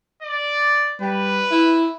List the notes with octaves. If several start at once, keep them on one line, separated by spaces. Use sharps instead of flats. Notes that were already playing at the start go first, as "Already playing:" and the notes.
D5
G3 B4
E4